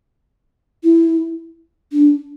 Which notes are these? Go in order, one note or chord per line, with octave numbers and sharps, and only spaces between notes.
E4
D4